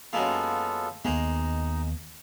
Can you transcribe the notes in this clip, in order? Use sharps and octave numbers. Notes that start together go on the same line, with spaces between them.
F#2 G#3 A#3 B3 F4 A4
D#2 G#3 A#3 B3 D#4